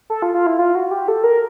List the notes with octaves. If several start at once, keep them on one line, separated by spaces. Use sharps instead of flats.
A4
F4
F4
E4
F4
F#4
G4
A4
A#4